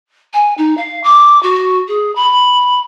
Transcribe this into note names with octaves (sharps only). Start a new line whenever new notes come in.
G#5
D#4
F5
D6
F#4
G#4
B5